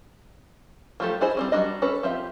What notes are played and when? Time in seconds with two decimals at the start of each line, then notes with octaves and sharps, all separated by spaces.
1.00 F3 F#3 A3 G4 A4
1.21 D4 E4 G#4 C5 D#5
1.37 G3 C4 C#4
1.52 F#3 G3 D4 D#5
1.82 C#4 A4 B4
2.03 F3 C4 G4 E5